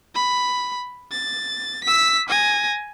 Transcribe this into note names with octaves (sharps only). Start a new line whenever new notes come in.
B5
A6
E6 B6
G#5 A#6